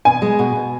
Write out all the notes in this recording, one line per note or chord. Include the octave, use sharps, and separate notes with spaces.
B2 G#5
G#3
B2
B2